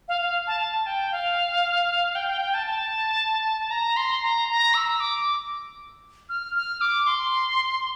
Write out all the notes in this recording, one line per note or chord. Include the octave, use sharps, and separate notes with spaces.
F5
F5
A5
A5
G5
F5
G5
G5
G5
A5
A5
A#5
C6
A#5
A#5
E6
D6
F6
F6
D6
C6